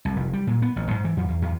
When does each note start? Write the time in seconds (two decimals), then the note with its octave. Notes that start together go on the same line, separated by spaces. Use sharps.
0.05 C2
0.16 F1
0.33 G3
0.47 A#2
0.62 B3
0.76 A1
0.91 G#2
1.05 E3
1.17 F2
1.29 E2
1.42 E2